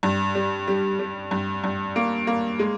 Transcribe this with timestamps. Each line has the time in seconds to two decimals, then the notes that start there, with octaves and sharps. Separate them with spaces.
0.03 G2
0.35 G3
0.68 G3
0.99 G3
1.31 G2
1.64 G2
1.96 A#3
2.27 A#3
2.59 G#3